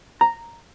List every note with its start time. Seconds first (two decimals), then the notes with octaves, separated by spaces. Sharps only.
0.21 A#5